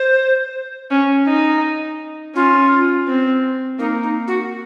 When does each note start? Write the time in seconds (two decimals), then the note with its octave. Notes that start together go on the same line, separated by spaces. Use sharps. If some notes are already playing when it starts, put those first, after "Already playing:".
Already playing: C5
0.91 C#4
1.27 D#4
2.35 C#4 F4
3.08 C4
3.79 A#3 D#4
4.03 D#4
4.28 F#4